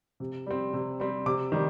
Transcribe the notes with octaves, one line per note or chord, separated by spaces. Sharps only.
C3
G3 C4
C3
G3 C4
C3 D6
D#3 G3